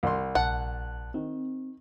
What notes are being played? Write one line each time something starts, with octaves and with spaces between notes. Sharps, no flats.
C2 C6
A#1 F#5 A5 F#6
D#3 C4